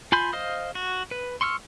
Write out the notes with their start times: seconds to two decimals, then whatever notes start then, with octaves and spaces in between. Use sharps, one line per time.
0.12 F4 G#5 B5 C6 G6
0.33 C5 D#5 F5 D#6
0.75 F#4
1.11 B4
1.41 C6 C#6 E6 F6